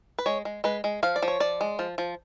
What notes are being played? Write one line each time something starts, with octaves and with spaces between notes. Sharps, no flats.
B4
G#3 C#5
G#3
G#3 B4
G#3
F3 F5
D5
F3
C#5
F3 D5
G#3
F3
F3